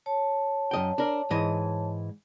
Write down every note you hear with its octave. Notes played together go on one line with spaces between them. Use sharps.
C#5 A5
F#2 D#5 G5
D4 A#4
G#2 E3 D#5